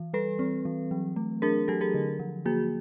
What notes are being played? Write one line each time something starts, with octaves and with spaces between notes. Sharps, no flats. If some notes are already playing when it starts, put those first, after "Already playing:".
Already playing: E3
G3 A4 B4
C4
E3
F#3
A3
D4 G#4 A#4
F#3 G4 A4
G#4 A#4
D3
F3
A#3 F#4 G#4